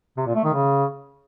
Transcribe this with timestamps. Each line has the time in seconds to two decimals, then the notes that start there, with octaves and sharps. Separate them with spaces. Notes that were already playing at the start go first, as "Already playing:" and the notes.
0.17 C3
0.26 A#2
0.35 A3
0.44 D#3
0.53 C#3